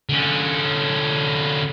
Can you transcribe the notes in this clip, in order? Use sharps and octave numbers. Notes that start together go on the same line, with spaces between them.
D3 C#4